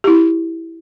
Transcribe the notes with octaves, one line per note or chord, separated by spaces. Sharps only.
E4 G4